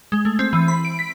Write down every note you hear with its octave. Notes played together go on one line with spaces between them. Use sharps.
G#3
A3
C4
E3
B5
D7
B6